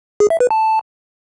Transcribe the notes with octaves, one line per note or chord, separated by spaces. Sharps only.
G#4
E5
B4
A5